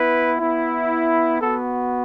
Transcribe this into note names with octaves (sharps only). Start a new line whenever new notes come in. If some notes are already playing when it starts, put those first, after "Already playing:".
Already playing: B3 E4 B4
B3 E4
B3 F#4 A4